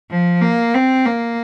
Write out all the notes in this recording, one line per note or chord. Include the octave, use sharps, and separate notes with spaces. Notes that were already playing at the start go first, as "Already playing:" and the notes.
F3
A#3
C4
A#3